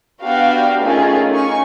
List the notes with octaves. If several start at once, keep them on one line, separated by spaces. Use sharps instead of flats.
B3 D4 F#4 G4 F5 G5
A3 C#4 D#4 F4 G#4 A#4
C#4 D#4 G#5 C#6